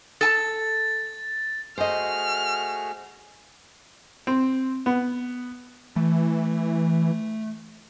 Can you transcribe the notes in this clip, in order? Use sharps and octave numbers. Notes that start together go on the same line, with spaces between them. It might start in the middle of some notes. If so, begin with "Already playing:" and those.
A4 G#5 A5 A6
A3 F#4 G#4 C5 D#5 F6
C4
B3
E3 A3